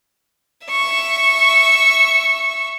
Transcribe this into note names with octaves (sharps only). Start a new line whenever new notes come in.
E5 C#6